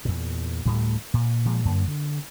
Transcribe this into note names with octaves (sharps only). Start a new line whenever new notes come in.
E2 A#2
D2 A2 G3 A3
A#2
A#2 F3 G#3
F#2 D3 A#3
D3